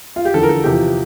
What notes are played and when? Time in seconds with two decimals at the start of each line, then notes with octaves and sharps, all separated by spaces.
0.16 F4
0.25 G4
0.34 E2 D3 F3 A4
0.43 A#4
0.49 A4
0.64 E2 C3 F3 G4